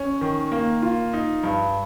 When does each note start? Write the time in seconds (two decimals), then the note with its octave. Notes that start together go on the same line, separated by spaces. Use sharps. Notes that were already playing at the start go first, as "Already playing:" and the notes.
Already playing: C#4
0.21 D#3
0.52 A#3
0.82 F4
1.13 D#4
1.43 G2